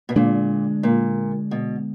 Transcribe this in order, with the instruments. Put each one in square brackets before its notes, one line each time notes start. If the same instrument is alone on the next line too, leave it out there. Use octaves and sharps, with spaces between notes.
[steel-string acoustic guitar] B2
[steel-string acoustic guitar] A#2 [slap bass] D3 G#3 D4
[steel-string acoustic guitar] A#2
B2